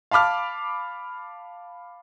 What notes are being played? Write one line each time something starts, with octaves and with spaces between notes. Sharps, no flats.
F5 A5 B5 D6 F6